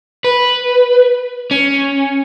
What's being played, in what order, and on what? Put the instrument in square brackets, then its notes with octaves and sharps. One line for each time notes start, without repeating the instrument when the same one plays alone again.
[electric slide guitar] B4
C#4